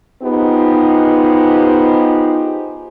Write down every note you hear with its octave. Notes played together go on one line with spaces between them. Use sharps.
B3 D#4 F4 G4 G#4 C5